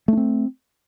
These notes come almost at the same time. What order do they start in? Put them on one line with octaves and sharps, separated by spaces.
A3 D4 C4